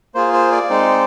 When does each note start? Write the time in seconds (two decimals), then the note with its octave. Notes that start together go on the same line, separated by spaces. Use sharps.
0.15 A#3 F4 G#4 C5
0.33 C5
0.52 D5
0.70 G#3 C4 D#4